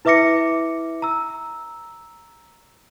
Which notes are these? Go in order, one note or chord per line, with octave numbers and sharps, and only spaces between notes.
E4 B4 E5 D6 A#6 C#7
A#5 E6